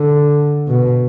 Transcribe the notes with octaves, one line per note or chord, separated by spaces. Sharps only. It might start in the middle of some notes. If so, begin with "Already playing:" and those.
Already playing: D3
B2